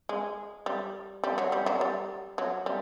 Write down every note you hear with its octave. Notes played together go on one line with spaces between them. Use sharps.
G#3
G3
G3
F#3
G3
F#3
G3
F#3
G3